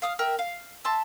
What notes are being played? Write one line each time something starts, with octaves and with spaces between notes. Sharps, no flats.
F5 D#6 F6
A#4 E5 G5
F5
E5 A5 C6